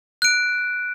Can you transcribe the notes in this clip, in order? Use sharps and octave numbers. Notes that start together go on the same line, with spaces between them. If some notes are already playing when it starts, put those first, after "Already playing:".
F#6 D7